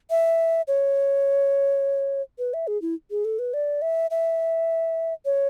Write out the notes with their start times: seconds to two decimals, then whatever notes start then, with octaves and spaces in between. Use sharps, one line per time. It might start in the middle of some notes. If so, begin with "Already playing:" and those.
0.10 E5
0.68 C#5
2.39 B4
2.54 E5
2.67 G#4
2.82 E4
3.11 G#4
3.25 A4
3.39 B4
3.54 D5
3.82 E5
4.11 E5
5.25 C#5